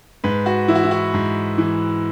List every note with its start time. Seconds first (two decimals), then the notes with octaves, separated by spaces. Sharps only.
0.24 G#2 B4
0.46 F#4
0.68 E3 E4
0.75 F#4
0.83 E4
0.91 F#4
1.14 G#2
1.58 E3